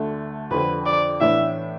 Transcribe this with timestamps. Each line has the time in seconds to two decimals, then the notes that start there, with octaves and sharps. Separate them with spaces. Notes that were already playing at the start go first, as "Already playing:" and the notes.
Already playing: D2 D3 A3
0.51 F2 D3 F3 C4 B4
0.86 D5
1.21 A2 E3 B3 D4 E5